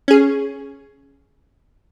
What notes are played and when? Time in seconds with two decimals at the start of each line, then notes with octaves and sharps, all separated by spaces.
0.08 C#4 G#4